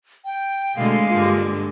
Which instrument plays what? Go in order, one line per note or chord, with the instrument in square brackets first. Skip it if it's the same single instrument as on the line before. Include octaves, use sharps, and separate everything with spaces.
[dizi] G5
[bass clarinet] B2 [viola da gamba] D3 A3 C4 [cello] G#3 [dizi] F5
[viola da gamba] G2 D3 A#3 [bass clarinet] F4